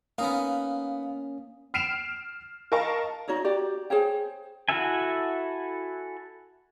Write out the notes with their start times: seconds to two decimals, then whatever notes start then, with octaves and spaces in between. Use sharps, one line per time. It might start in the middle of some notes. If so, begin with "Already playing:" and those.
0.18 A#3 B3 C#4 D#4 F5
1.74 F6 C7 D7 E7 F7
2.72 A#4 D#5 F5 A5 C#6
3.28 D#4 F#4 C#5 D5
3.44 F#4 G4 D5
3.90 G#4 C5 C#5 G5
4.69 E4 F#4 A4 E5 G#5